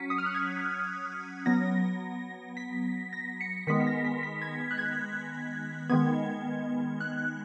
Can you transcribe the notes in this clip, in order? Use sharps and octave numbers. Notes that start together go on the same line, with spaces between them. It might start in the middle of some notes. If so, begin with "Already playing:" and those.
Already playing: F#3 C#4 B6 C#7
D#6
F6
F#6
G#6
F#3 B3 A#6
B6
A#6
C#7
D#3 G#3 B3 B6
B6
A#6
B6
B6
G#6
F#6
G#6
D#3 G#3 B3 G#6
F#6